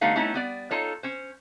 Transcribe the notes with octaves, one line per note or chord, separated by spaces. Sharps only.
D3 G3 A3 B3 D#4 F5
G3 A3 B3 C#4 D#4 E4
G3 B3 D5
D#4 F4 A4 C#5
C#4 C5